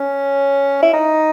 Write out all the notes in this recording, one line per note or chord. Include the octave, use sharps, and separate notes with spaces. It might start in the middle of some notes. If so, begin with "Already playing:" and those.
Already playing: C#4
E4
D#4